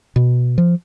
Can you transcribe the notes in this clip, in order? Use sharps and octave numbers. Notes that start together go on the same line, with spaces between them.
B2
F3